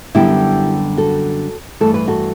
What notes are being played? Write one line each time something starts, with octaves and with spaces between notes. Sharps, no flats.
F#2 D3 G3 B3 E4 G4
F#4 A4
G2 E3 A3 A4
B4
F#4 A4